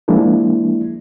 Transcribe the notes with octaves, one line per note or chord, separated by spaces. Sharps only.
F3 G#3 A#3 D4 E4